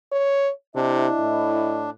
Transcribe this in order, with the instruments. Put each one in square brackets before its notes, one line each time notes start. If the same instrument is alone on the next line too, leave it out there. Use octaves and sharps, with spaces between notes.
[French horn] C#5
[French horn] C3 [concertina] D4 [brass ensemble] E4 D#5
[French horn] A2